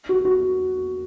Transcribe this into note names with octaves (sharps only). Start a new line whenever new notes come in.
F#4
F#4